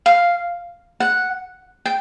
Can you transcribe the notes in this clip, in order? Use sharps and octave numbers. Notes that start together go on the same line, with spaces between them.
F5
F#5
G5